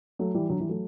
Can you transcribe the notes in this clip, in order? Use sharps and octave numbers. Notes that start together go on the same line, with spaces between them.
F#3 A3
E3 G3
D3 F#3
E3 G3
F#3 A3